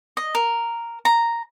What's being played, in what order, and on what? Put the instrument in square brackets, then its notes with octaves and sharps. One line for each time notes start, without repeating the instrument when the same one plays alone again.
[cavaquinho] D#5
A#4
A#5